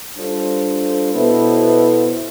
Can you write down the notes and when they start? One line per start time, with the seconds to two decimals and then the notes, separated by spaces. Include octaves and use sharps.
0.17 G3 D4 F4 A4 C5
1.13 B2 B3 E4 A4 C5